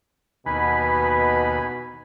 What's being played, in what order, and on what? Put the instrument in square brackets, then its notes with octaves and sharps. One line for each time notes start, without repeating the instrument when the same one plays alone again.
[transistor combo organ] D#2 B4 [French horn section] B2 [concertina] G#5 B5